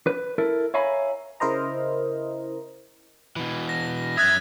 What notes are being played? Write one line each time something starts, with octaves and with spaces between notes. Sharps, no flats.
B4
E4 A4 A#4
C#5 E5 F5 G#5 A#5 B5
C#3 E4 A#4 C5 D#5 A#5
B2 E3
A#6
F#2 E5 D#6 F#6 G#6 A6